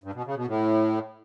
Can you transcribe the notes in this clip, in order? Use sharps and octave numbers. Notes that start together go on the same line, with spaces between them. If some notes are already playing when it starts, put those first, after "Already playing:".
G2
B2
C#3
B2
A2